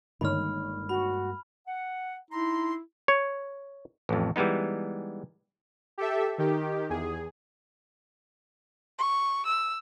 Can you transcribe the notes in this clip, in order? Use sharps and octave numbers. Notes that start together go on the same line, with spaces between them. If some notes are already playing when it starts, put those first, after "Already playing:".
G1 G2 D#3 G#3 A#3 C#5 B5 F6
F#4 B5
F#5
D#4 E4 A#5 C6
C#5
A1 F2
E3 G3 G#3 B3 D#4
G4 A4 E5
D#3 G4
E2 G#4
C#6
E6